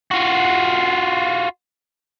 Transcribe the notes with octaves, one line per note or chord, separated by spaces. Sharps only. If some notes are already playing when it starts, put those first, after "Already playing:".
F4 F#4